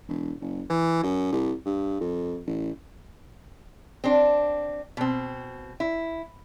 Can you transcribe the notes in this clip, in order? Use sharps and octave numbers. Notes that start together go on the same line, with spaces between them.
E1
F#1
E3
F#2
C2
G2
F2
A1
C4 D4
B2 C4
E4